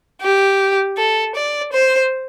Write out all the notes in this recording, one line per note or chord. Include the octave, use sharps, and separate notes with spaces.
G4
A4
D5
C5